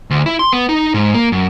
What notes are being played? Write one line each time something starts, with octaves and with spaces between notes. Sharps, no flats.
D2
E4
C6
B3
D#4
G#2
A#3
F#2